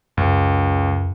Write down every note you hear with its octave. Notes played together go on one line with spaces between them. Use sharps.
C#2 F#2